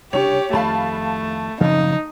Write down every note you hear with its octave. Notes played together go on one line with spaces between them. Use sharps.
C2 C#3 D4 G4 C#5
F2 D#3 A3 F5 A5 B5
F#2 A2 C#3 F3 C4 D#4